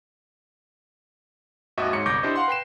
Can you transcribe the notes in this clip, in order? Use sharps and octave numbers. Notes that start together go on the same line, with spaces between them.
G#1 D#2 F#4 D#5 E5
G#2 C#5 C#7
G1 C2 C#6 D6 G6 A#6
D4 E4 G4 C5 D#5
F5 F#5 C6
B4 G5 C7 E7